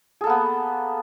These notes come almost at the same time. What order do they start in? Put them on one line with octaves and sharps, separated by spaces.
G#4 A4 A#3 B3